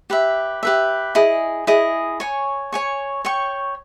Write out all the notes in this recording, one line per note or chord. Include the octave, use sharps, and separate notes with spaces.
G4 B4 E5
G4 B4 E5
E4 G#4 D#5
E4 G#4 D#5
C#5 G#5 C#6
C#5 G#5 C#6
C#5 G5 C#6